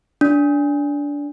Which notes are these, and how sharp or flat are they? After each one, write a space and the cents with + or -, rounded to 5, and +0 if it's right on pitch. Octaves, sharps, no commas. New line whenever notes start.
D4 -20